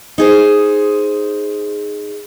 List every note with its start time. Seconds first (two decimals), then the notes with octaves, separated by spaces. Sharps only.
0.18 D#4 G#4 C5